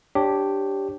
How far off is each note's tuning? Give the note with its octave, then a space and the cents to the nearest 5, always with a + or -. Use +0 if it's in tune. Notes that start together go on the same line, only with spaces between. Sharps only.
D4 +0 G4 +0 C#5 -15